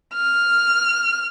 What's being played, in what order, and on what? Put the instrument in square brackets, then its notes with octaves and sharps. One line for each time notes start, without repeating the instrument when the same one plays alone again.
[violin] F6